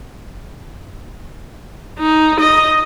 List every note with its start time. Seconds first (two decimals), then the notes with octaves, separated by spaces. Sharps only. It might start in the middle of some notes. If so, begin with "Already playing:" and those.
1.98 D#4
2.40 D#5